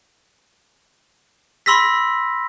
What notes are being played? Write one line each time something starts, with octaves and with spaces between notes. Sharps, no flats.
B5 C6 E6 A#6 B6